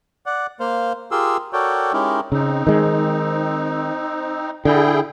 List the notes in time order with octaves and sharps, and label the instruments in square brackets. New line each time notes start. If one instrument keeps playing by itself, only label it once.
[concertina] D5 F#5
A#3 C5 F5
F4 G4 G#4 A#4 C6 E6
F#4 A4 A#4 C#5 D5 G5
G#3 C#4 D#4 E4 G4 A#4
[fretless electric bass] C#3 [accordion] C4 D#4
[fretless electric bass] D#3 G#3
[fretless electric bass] D3 [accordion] E4 G#4 G5